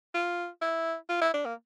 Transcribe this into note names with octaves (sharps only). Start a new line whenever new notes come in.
F4
E4
F4
E4
D4
A#3